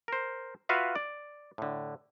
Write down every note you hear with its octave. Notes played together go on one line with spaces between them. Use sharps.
A#4 C5
F4 F#4 B4 E5 F5
D5
A2 D3